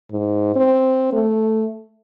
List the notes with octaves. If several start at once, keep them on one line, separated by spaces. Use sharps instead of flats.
G#2
C4
A3